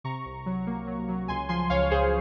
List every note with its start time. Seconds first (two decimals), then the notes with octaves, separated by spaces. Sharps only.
0.04 C3 A#5 C#6
0.25 C2
0.46 F#3
0.67 A#3
0.87 F#3
1.09 F#3
1.28 C#2 G#5 C6
1.49 F3 G#5 C6
1.70 C#2 C#5 F5
1.91 C#2 G#4 C5